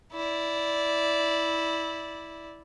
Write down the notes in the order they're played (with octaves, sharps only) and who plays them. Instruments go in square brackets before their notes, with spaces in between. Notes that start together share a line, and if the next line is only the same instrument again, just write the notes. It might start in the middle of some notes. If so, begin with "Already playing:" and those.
[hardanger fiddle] E4 D5